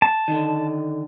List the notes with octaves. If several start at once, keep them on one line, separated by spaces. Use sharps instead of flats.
A5
D3 D#3